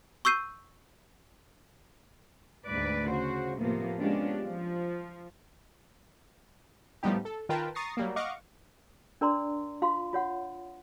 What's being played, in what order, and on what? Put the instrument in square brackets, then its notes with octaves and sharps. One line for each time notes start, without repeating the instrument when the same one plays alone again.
[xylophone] C#6 E6 G6 C7 D#7
[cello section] D2 G#2 B4 D5
C#3 F#4 C5
A2 C3 F3 A#3 B3
G#3 B3 C#4 D4 F4 G4
F3
[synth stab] A2 F3 G3 B3 D#4 G4
A4
D#3 F4 A#4 B4 G5 A5
A#5 C#6 D#6 A6 A#6 C7
F#3 G3 A#3
D#5 F5 F#5 C#6 D6
[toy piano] D4 A#4 D5 A#5 C6
F4 F5 C6
F4 C#5 F#5